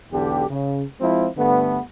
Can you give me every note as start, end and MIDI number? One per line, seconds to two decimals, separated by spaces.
0.11 0.45 35
0.11 0.45 40
0.11 0.45 50
0.11 0.45 67
0.50 0.84 49
1.01 1.28 53
1.01 1.28 56
1.01 1.28 60
1.01 1.28 64
1.01 1.28 65
1.37 1.80 43
1.37 1.80 50
1.37 1.80 57
1.37 1.80 59